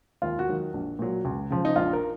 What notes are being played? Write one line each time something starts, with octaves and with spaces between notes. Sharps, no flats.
D#2 F4
F#4
D#3 F#3
A#1
A#2 F#3
C#2
C#3 F3
D#4
A#1 F4
A#4